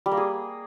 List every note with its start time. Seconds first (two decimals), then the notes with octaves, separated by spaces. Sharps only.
0.06 G3
0.11 A#3
0.17 G#4